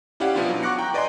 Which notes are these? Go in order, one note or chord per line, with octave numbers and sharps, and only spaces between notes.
C#4 E4 G4 D5 F5 F#5
B2 F3 B3 D4 E4 F4
F#3
F#5 C#6 D6 F#6 A#6 C#7
G5 A#5
B4 D5 D#5 G5 G#5 C6